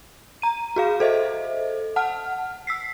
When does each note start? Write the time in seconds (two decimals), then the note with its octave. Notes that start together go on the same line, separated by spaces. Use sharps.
0.42 A#5 D#7
0.76 F#4 G#4 F5
1.00 A4 C5 D#5 E5
1.96 F#5 A5 F6
2.67 E6 B6 C7